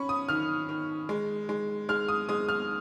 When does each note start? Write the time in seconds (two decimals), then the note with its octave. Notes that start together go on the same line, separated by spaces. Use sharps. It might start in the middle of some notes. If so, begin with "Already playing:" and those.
Already playing: C#4 B5 C#6
0.09 D#6
0.29 D#3 F6
0.69 D#3
1.09 G#3
1.49 G#3
1.89 G#3 F6
2.08 D#6
2.29 G#3 D#6
2.49 F6